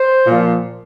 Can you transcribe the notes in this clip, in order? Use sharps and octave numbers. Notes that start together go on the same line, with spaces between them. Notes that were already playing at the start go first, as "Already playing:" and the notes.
Already playing: C5
A#2 F3